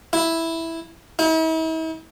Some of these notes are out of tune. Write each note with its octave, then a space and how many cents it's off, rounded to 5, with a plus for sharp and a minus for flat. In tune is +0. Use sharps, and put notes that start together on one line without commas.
E4 -5
E4 -45